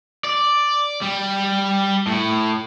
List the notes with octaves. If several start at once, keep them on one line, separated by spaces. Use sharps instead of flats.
D5
G3
A2